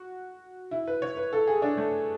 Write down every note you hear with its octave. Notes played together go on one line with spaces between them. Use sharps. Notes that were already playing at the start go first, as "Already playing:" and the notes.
Already playing: F#4
E4
B4
C#5
B4
A4
G#4
D4
A3